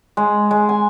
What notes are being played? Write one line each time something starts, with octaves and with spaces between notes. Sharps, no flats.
G#3
G#3
G#5